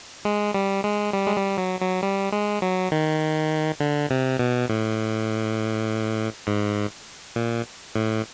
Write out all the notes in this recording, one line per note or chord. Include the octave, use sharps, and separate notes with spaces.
G#3
G3
G#3
G3
G#3
G3
F#3
F#3
G3
G#3
F#3
D#3
D3
C3
B2
A2
G#2
A#2
A2